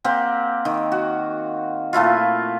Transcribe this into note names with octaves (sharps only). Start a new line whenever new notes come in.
A#3 C4 G4 F#5
D#3
F#4
A#2 A3 E4 F4